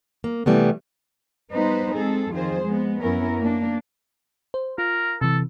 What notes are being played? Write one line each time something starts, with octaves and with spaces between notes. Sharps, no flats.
A#3
C3 E3 G3 A3 B3
G3 B3 D#4 B4 C5
G#3 C4 G#4 A4
F2 D#3 F4 G#4 C5
G#3 B3
F#2 B3 C#4 E4 A#4
A#3 D4
C5
F4 A#4
C3 E3 A4